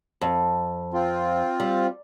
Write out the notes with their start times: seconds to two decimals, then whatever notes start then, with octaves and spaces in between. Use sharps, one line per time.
0.21 F2
0.94 C4 F4
1.60 G3